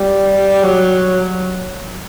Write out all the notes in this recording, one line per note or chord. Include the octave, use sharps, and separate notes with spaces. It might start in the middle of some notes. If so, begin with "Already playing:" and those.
Already playing: G3
F#3